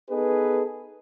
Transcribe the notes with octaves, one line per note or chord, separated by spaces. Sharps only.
B3 D#4 G#4 A4 B4